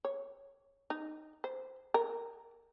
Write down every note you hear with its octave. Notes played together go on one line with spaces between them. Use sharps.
C#5
D#4
C5
A#4